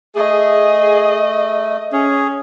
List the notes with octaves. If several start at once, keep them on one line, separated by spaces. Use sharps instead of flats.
A3 G#4 D#5
C#4 G#4